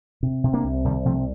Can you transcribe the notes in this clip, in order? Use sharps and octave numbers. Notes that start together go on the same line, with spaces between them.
C3
C3
A#3 D4
C2
C2 D#3 G3
C3 F3 A3